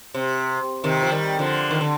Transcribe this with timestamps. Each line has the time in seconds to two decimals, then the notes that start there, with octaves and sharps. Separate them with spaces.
0.14 C3
0.84 C3 D#3
1.03 F3
1.11 D#3 G3
1.39 D3 F3
1.71 D#3
1.81 D3